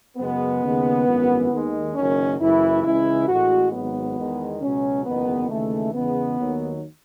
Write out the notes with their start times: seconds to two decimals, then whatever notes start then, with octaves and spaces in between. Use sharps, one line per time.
0.18 F#2 C#3 G#3 B3
0.62 D#2 C#3 G#3
1.06 G#1 F#2 E3
1.51 D#2 D#3 G#3
1.95 F#1 F#2 D#3 C#4
2.39 F#1 F#2 E3 E4
2.84 C#2 C#3 E3 G#3 E4
3.28 A1 A2 G#3 F#4
3.72 G#1 G#2 F#3 B3
4.17 E2 D#3 G#3
4.61 C#2 B2 F#3 C#4
5.05 F#1 E2 D#3 G#3 B3
5.50 D#2 C#3 E3 G#3 A3
5.94 E2 C#3 G#3 B3
6.38 D#2 D#3 F#3